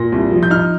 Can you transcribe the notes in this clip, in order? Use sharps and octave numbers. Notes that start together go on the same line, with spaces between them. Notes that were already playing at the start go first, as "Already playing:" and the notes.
Already playing: A#2 A#6
C2
F3
G6
D#4 F6